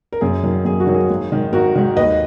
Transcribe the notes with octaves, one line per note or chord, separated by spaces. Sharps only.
A#4
F#2 G#4
D#3 F#3 A#3
F#2 G#4
F#4
D#3 F#3 A#3
G#4
G#1
G#2 D#3
G#1 F#4 A#4
G#2 D#3
D#2 B4 D#5